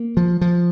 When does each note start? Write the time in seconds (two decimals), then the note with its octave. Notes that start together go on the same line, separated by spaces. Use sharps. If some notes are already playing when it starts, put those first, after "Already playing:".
Already playing: A#3
0.17 F3
0.41 F3